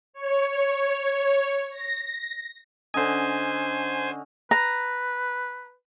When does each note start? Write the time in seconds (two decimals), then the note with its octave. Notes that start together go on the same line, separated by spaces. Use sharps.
0.14 C#5
1.70 A#6
2.94 D3 C#4 C5 D#5 G#5
4.51 B4 A#5